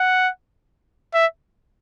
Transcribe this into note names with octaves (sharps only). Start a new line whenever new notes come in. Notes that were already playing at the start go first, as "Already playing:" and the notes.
Already playing: F#5
E5